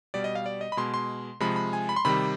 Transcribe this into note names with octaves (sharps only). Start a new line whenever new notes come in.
B2 G3 D5
D#5
F5
D5
D#5
B5
B2 G#3 C6
C6
C3 F3 G#3 B5
B5
G#5
B5
C6
C3 D#3 G3 B5